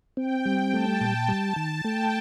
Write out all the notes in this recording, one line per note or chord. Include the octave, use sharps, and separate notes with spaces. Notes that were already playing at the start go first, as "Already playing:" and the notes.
C4 G5
G3
A3 A5
A#2
G3
D#3
A3 G5